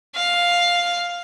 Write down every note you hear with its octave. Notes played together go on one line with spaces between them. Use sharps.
F5